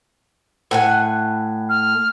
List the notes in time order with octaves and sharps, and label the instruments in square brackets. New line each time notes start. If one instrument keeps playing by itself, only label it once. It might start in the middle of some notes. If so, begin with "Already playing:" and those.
[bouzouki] A2 F#5 G#5
[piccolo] F6